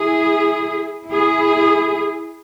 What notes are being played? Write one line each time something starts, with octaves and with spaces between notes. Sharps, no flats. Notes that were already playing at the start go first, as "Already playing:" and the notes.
Already playing: E4 G#4
E4 G#4